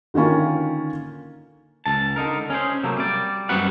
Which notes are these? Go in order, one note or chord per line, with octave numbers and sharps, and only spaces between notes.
D3 D#3 A#3 C#4 F4
C#2 A5
D3 D#4 A#4
C#4 G#4 C5
C3 F#3 A3 A#3
G3 D5
F#2 G3 C4 F#4 B4 F#5